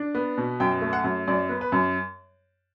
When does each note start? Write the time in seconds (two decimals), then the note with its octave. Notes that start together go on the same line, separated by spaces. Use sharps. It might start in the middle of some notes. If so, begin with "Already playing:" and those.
Already playing: D4
0.15 B3
0.38 B2
0.60 F#2 G5
0.82 A3
0.93 F#5
1.04 F#2
1.28 F#2 D5
1.49 B3
1.61 B4
1.72 F#2